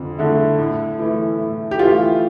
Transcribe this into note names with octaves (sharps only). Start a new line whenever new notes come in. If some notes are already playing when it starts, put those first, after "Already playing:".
Already playing: F2 D3
D3 A3 E4
A2
E3 A3 E4
A2
G4
E3 A3 E4 F4